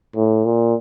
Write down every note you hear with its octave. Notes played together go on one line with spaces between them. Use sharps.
A2
A#2